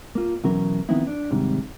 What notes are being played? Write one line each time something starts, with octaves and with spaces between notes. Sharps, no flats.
A#3 F4
B2 E3 F#3 C#4 A#4
D#3 F3 B3 C4 D#4 E4
D4
G#2 C3 D#3 G3